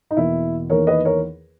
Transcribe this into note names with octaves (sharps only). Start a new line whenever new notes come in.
D#4
E2 B2 A#3 E4
E2 D#3 A#3 A#4 C#5
B4 D#5
A#4 C#5